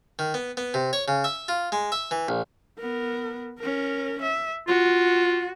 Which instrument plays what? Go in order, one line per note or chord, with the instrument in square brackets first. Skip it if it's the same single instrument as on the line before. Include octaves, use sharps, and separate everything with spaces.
[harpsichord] D#3
B3
B3
C3
C#5
C#3
E5
F4
G#3
E5
E3
A#1
[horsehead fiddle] B3 A#4
C#4 A#4
E5
[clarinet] F4 [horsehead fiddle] F#4